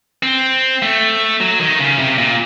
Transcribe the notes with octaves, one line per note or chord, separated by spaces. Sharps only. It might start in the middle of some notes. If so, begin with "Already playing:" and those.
C4
A3
F#3
D#3
C#3
C3
A#2